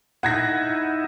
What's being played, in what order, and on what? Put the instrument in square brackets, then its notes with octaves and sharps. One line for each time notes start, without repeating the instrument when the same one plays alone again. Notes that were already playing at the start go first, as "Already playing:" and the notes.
[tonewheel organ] D#4 E4 [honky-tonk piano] F#5 G#6 A#6